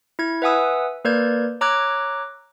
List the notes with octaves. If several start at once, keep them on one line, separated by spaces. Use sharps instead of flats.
E4 G#6
B4 E5 F#5 G#5 D#6 E6
A#3 A#4 B4 D5 G6 G#6
C#5 A#5 D6 E6 F#6 G#6